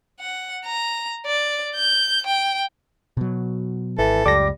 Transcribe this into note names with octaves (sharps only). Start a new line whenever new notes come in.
F#5
A#5
D5
G6
G5
B2 F#3
G#1 E3 A4
C#2 F#2 G3 D6 A#6